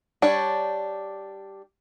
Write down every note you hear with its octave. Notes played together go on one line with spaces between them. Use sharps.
G3 D4 C#5